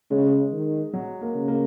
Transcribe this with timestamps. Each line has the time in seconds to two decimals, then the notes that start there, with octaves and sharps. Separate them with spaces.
0.10 C#3 G#3
0.52 D#3
0.93 F#3
1.21 A#3
1.35 C#3
1.48 A#3